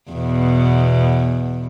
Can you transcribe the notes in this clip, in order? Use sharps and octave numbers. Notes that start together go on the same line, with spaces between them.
E2 B2